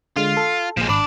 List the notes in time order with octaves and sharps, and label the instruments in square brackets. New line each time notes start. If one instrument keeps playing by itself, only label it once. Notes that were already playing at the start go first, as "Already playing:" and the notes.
[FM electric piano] D3 G#3 [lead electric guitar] F4
[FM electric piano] A4
[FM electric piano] A#1 A#2 [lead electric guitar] F3 G#3
[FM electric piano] G#1 B5 B6 [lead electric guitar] D4 D5